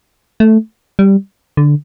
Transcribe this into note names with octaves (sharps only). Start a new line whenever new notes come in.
A3
G3
D3